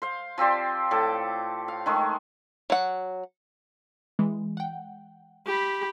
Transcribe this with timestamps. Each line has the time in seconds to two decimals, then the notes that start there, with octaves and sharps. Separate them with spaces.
0.02 C5 F5
0.38 F3 C4 G4 D5
0.91 A2 A4 D6
1.68 F5
1.86 D#3 G#3 A3
2.70 F#3 F#5
4.19 E3 G#3
4.57 F#5 G5
5.46 G4 B5